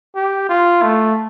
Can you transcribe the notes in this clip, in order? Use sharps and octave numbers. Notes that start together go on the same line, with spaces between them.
G4
F4
A3